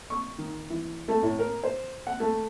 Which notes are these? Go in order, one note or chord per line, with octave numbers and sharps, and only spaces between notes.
C#6
D#3
E3
A3
A2
A#4
C5
F#5
A3